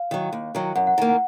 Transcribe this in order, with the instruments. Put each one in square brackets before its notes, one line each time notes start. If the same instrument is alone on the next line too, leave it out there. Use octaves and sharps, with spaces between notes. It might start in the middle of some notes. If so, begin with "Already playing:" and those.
Already playing: [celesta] F5
[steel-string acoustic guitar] D#3 F#3
D#2
D#3 F#3
[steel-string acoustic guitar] F#2 [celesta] F#5
[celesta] F#5
[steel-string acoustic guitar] D#3 A#3
[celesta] F#5